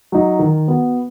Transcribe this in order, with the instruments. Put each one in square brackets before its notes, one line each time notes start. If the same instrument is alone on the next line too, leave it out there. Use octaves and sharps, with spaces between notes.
[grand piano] F#3 D#4
D#3
B3 F#4